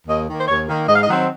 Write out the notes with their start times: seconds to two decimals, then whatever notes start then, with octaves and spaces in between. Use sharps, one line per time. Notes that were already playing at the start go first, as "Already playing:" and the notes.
0.07 D#2 D#5
0.28 D#3 A#3
0.40 C5
0.48 D#2 C#5
0.68 D#3 A#3
0.88 G#2 D#5
0.96 F5
1.03 D#5
1.08 D#3 F#3 C4 D#4